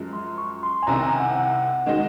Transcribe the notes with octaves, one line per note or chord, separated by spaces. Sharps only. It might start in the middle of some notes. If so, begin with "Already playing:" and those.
Already playing: F#2 F3 G#3
C6
C#6
C6
G#5
C2 C3 D#3 A#5
A#5
G#5
F#5
F#5
D#3 G#3 D#4 F#4